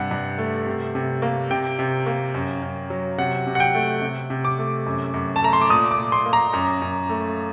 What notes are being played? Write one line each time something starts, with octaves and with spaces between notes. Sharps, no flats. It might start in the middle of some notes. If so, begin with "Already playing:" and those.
Already playing: G2 C3 F#5
G2
A3
C3
C3
A#3
C3 G5
C3
A#3
F#2
F#2
F#3
C3 F#5
C3
F#5
G5
A3
C3
C3
D6
A3
F#2
F#2
A5
A3 A#5
C6
D6
A#2 D#6
D6
A#2
C6
A#3
A#5
F#2
F#2
A3